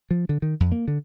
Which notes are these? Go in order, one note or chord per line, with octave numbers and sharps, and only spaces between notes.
F3
D3
D#3
F2
A#3
D3